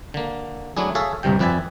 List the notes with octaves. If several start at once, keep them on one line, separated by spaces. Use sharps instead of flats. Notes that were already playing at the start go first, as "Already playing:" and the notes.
D3 A#3
F#3 A3 D4 E4 G#4
G#4 A4 C#5 E5 F5
G1 C2 G2 C3 G5
F2 C4 B4 D5 E5 G#5